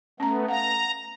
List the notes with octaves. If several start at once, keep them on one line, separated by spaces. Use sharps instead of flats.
A3 B3 C#4 A#5
F5 F#5 A#5